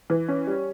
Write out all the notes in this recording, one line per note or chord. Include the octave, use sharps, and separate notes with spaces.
E3
C#4
G3